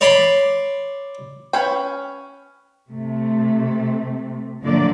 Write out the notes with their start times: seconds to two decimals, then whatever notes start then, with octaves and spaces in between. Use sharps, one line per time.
0.01 C#5 D5 B5 C6
1.53 C#4 B4 C#5 G5
2.92 C3 A3
4.62 D3 F3 F#3 A3 A#3 D5